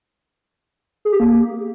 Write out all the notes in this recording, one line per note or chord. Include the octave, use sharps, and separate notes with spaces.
G#4
G4
A#3